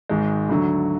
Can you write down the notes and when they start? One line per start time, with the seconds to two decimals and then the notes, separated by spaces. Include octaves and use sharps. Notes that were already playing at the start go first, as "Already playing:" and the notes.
0.09 G#1 G#2 G#3
0.49 D2 D3 F#3